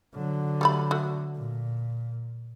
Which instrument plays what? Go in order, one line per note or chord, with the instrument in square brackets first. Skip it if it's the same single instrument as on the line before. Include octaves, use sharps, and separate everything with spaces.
[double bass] D3 F#3
[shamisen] G3 A3 B5
A3 F#4
[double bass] A#2